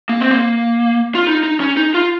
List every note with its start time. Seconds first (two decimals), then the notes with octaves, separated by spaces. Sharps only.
0.09 A#3
0.20 C4
0.31 A#3
1.15 F4
1.27 D#4
1.43 D#4
1.60 C#4
1.77 D#4
1.94 F4